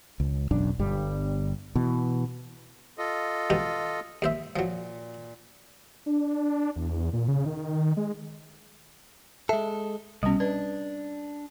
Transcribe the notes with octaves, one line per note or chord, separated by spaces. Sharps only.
C#2
E1 B1 F#2 D4
G1 G2 G3
B2 E3
F4 A4 D#5
B2 D#4 G4
D#2 C5 E5
A#2 F3 F#3
D4
E2
A#2
C#3
D#3
G#3
G#3 A4 E5
C2 B2 G3 C#4
D4 B4